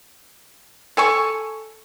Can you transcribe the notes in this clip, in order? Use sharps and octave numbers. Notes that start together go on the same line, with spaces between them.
A4 G#5 C#6